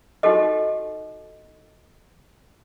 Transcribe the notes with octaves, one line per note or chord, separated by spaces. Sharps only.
D#4 F#4 G4 A4 D#5